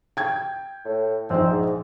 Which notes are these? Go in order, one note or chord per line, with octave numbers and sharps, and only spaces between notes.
G5 G#6
A2
A#1 C4 D#4
G#2